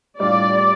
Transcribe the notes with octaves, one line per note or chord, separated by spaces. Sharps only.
A2 G3 D4 F4 D5